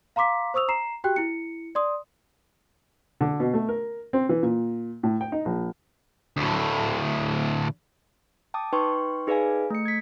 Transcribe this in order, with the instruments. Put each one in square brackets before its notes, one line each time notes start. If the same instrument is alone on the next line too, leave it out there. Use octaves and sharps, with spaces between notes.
[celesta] F5 A#5 C6 D6 B6
C5 C#6 D#6 E6 F7
A#5 C7 E7
F#4 G4 G5 F#6
E4 C#7
D5 C6 D#6
[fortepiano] D3
B2
A3
A#4
C4
E3
A#2
A2
G5
D#4
A#1
[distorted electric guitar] D2 A2
[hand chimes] G5 A5 D6 D#6
D#4 B4 G5 C6 C#6
D#4 G#4 B4 D5 F5 G#5
A3 C#7
G#6 B6